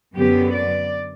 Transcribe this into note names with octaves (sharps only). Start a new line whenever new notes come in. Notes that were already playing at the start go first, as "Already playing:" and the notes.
F#2 D3 F#3 B3 G4
D5